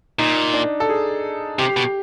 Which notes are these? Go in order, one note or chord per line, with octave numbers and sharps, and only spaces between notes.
A#2 D#4
D4
A4
G#4
C3 G4
B2